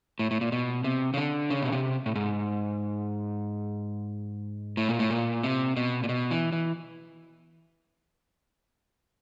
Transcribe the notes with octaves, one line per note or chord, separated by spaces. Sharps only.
A2
A2
A#2
B2
C3
C#3
D3
C#3
B2
C3
A2
G#2
A2
A#2
A2
A#2
C3
B2
A#2
B2
E3
E3